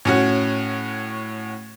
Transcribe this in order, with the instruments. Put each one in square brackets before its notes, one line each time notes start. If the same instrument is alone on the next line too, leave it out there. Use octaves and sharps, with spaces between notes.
[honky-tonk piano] A2 C#4 F#4